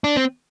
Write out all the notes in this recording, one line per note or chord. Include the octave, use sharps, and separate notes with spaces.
D4
C4